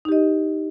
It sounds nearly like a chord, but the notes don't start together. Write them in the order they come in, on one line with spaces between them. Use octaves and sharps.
D#4 G4 D#5